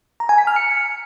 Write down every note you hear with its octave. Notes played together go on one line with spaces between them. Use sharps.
A#5
G#5
B6
F6
C#7